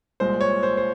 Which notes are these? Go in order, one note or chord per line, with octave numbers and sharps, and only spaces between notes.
C2 A#2 G#3 C5
C#5
C5
C5